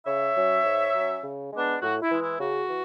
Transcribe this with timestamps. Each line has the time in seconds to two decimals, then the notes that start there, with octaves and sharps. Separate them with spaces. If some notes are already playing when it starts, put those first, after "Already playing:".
0.06 C#3 C#5 E5
0.36 F#3 C#4
0.65 G#2
0.94 F#3
0.99 C#4
1.24 C#3
1.53 G#3 B3 D4
1.82 A2 F#4
2.02 E4
2.12 E3 G#3
2.21 E4
2.40 C#3 F#4
2.69 E3